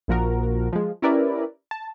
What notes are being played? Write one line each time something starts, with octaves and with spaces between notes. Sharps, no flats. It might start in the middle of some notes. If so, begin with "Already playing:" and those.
A#1 A#2 F3 F#4 A#4
F3 G#3
C#4 E4 G4 A#4 B4 D5
A5